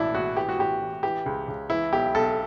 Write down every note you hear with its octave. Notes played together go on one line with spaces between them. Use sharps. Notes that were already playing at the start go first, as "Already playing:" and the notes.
Already playing: A1 B2 E3 D4 E4
A1 F#4
E3 G4
F#4
A1 G4
A1
E3 G4
C#2
C#2
E3 E4
B1 G4
B1 A4